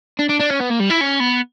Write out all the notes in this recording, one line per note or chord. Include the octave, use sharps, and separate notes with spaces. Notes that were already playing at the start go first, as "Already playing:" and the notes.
D4
D4
D4
C#4
B3
A#3
G3
E4
C#4
B3